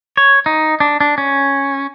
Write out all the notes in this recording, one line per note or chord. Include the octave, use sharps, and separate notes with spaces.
C#5
D#4
D4
D4
C#4